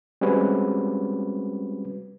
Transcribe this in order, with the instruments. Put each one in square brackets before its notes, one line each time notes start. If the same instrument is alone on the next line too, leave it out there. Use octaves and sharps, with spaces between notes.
[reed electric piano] G3 G#3 C4 C#4 F#4 B4